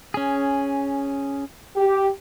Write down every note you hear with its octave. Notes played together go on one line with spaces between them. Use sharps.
C#4 G#4
G4